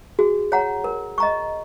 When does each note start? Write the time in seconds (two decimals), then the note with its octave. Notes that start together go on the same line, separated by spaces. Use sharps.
0.19 F#4 G#4
0.52 C#5 F#5 A#5
0.84 A#4
1.18 D#5 A#5 C#6